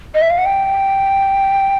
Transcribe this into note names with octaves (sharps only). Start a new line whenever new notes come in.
D#5
E5
F5
F#5
G5